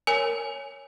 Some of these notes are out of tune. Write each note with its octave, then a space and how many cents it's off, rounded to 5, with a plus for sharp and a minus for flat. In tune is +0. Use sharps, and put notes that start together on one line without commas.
A#4 -10 C#5 +0 G#5 +0